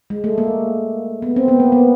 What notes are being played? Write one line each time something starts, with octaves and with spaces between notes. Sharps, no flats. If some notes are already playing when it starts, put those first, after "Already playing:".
G#3
A3
A#3
B3
C4
B3
A#3
B3